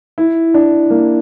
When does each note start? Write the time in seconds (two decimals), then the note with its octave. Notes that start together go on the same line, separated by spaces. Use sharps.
0.18 E4
0.54 D4
0.90 A#3